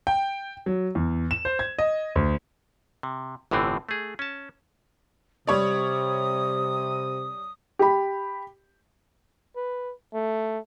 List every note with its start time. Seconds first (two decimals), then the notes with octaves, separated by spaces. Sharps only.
0.07 G5
0.66 F#3
0.95 E2
1.31 E7
1.45 C5
1.59 G#6
1.79 D#5
2.16 D2
3.03 C3
3.51 G1 A2 D3 E3 C4
3.89 A3 G#4
4.19 C#4 A5
5.47 C3 G3 C#5 D5 D#6
7.79 G4 B5
9.56 B4
10.14 A3